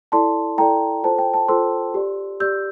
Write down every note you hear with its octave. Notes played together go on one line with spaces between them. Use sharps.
E4 A4 D5 A5 C6
E4 A4 D5 G5 A#5
F4 A4 C5 A5
G5
A5
F4 A4 C5 C6 E6
G4 D5
G4 D5 E6 G6